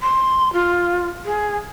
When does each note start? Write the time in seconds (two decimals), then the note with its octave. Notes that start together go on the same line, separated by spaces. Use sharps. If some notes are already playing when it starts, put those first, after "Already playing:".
0.01 C6
0.53 F4
1.25 G#4